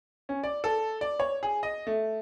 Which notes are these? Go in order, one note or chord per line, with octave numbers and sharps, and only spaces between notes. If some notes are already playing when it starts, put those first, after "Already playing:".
C#4
D5
A4
D5
C#5
G#4
D#5
A3